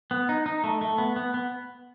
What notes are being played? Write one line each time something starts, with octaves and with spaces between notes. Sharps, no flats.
B3
D#4
D#4
A3
A3
B3
B3
B3